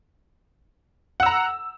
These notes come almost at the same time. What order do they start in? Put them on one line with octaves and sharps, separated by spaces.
F#5 E6 A#5